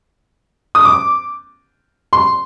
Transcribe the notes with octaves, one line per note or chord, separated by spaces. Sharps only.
D#6
D6
C6